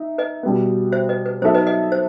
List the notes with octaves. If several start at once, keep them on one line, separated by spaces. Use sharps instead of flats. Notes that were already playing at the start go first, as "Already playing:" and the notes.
Already playing: D#4 E5
B4 D#5
B2 G3 B3
C5 E5
B4 D#5
B4
F#3 B3 D#4 A4 C5 E5
B4 D#5
B4 D#5
C5